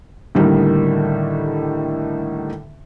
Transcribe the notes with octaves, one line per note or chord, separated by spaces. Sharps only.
A2 D3 D#3 G3 A#3 D#4